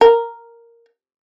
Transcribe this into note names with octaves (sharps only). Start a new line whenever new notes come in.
A#4